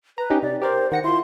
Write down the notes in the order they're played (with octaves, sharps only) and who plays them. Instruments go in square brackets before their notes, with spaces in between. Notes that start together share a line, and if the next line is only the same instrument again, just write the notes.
[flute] B4 [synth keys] A#5
[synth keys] C#4 D#4 G4
[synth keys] C3 [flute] D5
[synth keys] G4 A#4 D5 [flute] C5
[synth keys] D#3 A#6 C#7 [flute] F#5
[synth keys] E4 F4 [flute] C6